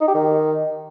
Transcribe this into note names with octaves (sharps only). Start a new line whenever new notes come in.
D#4
G4
D#3